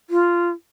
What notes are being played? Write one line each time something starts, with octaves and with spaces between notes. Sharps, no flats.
F4